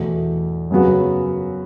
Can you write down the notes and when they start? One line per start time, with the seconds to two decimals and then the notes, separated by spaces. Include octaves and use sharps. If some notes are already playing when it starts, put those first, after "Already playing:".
Already playing: E2 B2 A3
0.70 F#2 C#3 F#3 B3 F#4